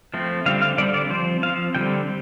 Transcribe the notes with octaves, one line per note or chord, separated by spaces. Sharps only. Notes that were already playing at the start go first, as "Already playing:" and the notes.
F3 A3 C4
D3 G3 C4 F5
F5
D3 G3 C4 D5
D5
F3 C4 C5
F3 C4 F5
D3 G3 C4 G5